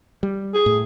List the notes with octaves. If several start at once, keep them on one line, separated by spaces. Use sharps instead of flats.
G3
G#4
A2